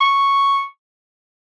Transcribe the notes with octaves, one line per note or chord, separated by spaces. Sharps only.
C#6